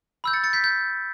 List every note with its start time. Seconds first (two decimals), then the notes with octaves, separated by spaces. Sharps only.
0.24 B5 E6 G6
0.33 A6 C#7
0.44 A6 C#7
0.53 G6 B6
0.64 G6